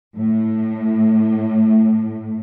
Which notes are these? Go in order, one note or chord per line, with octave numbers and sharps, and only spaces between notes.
A2